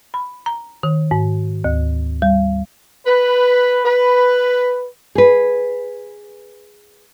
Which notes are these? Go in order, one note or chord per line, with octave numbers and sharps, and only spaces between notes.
B5
A#5
D#3
G#2
D2
G3
B4
B4
G#4 B4